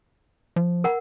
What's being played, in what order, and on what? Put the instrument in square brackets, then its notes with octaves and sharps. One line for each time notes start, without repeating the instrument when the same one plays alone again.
[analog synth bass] F3
[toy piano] A#4 F#5